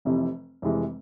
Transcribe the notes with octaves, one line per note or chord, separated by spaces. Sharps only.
F1 F2 C3 E3
F1 F2 C3 E3 G#3